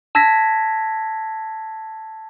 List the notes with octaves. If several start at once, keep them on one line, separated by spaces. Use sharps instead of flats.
A5 E6 G#6 A#6 B6